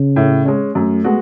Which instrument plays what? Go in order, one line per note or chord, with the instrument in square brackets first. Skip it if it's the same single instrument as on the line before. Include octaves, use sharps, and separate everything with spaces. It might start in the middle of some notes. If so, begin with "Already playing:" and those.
Already playing: [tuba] C#3
[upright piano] A2
G#3 C#4
[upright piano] F#2 [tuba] A3
[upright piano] G#3 B3 F#4